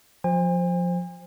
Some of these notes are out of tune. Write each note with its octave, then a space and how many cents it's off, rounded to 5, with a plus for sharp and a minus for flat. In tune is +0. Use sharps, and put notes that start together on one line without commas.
F3 +25 C5 +0 G#5 -45